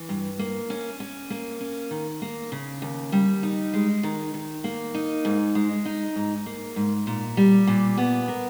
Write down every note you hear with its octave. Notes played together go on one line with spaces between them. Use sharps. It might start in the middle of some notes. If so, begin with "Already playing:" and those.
Already playing: E3
G2
A#3
C#4
C#4
A#3
C#4
D#3
A#3
C#3
D#2
G3
D#4
G#3
D#3
D#3
A#3
D#4
G#2
G#3
D#4
G#2
A#3
G#2
A#2
G3
A#2
B3
A#4